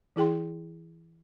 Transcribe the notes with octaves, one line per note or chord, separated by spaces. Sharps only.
E3 E4 G#4 G5 C6